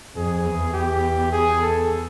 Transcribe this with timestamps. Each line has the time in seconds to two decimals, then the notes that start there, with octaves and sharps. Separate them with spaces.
0.16 F2 G#4
0.45 E2
0.73 G4
1.32 G#4
1.62 A4